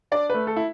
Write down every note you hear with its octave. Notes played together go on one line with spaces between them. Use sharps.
D4 D5
A3 B4
A4
E4